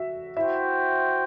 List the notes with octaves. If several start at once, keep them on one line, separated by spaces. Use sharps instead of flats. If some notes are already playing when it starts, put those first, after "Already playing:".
Already playing: F#4 E5
E4 F#4 C5 E5 G5